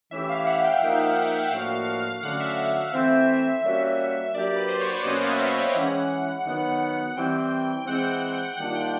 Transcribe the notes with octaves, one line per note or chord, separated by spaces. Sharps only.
E3 A3 C#4 E4 G4 E5
F5
F#5
G5
F3 A#3 D#4 F#5
A2 F3 A#3 D4 F#4 F5
F5
D3 F#3 A3 C#4 F#4 F#5
E5
E5
E3 A3 C4
G3 A#3 C#4 F#4
F#3 A#3 D4 G4 D5
B4
C5
C#5
D5
B2 F#3 A#3 C#4 F#4 D#5
F5
E5
F5
G5
E3 G#3 C#4 E4 F#5
D#3 F#3 B3
E3 G3 C4 G5
E3 G#3 C4 F#5
D#3 G3 A#3 D4 F4 F#5
G5